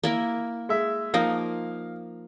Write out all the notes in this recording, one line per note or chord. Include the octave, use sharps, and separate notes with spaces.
A#3 E4 A#4
G#3 E5
F3 A#3 D#4 F5